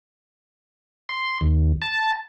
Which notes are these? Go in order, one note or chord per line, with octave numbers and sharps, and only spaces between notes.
C6
D#2
A5